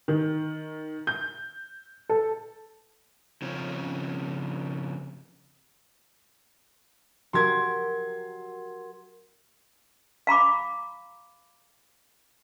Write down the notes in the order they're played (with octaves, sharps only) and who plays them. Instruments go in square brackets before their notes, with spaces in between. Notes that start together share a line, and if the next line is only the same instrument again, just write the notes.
[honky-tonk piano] D#3
G6
A4
[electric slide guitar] C#3 F3 C4 C#4
[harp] F#3 G4 A#4 [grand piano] C6 G#6
[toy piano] F5 A#5 B5 D6